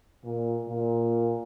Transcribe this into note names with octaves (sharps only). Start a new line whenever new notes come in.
A#2
A#2